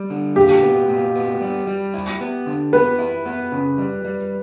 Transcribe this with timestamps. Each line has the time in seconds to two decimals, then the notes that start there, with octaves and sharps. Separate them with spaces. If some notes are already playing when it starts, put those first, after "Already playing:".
Already playing: G3
0.10 D3
0.36 A#2 G4
0.62 B3
0.88 A#2
1.15 B3
1.41 G3
1.67 G3
1.94 E4
2.21 B3
2.47 D3
2.73 B3 B4
2.99 E4
3.26 B3
3.52 C#3
3.78 G3
4.05 G3